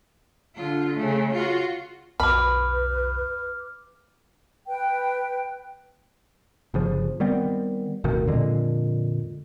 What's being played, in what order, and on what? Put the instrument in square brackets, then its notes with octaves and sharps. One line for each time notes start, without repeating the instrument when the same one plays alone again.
[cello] D3 F4
C#3 A3
F4 F#4
[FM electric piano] B1 F2 [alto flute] B4 [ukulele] B5 [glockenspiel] D6 F6
[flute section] B4 G5
[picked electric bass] G1 C#3 F3
D#3 G3 B3 C4
F1 D2 B2 D#3
F2 A#2 D3 G#3